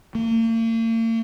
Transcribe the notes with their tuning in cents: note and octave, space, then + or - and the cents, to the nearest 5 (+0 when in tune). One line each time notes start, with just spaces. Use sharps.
A#3 -45